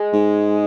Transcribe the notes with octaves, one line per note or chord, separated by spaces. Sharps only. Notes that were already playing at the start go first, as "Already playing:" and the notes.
Already playing: G#3
G#2